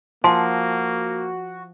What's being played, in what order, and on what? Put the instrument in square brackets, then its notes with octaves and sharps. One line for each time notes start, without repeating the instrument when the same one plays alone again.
[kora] F3 [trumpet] A#3 [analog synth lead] F#4 [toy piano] G#5 A5 C6